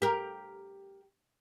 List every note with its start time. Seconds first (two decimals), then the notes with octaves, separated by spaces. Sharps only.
0.02 G4 A#4